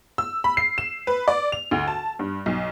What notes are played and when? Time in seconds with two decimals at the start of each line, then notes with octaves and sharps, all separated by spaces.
0.18 E6
0.44 B5
0.57 C7
0.78 E7
1.07 B4
1.28 D5
1.52 F7
1.71 D2
1.88 A5
2.19 G2
2.46 B1